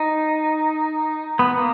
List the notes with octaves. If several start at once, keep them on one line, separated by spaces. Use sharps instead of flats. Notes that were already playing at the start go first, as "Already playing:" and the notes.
Already playing: D#4
B3
A#3